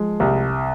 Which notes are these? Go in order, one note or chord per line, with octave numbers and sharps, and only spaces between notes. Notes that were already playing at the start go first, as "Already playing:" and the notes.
Already playing: F3 G#3
C2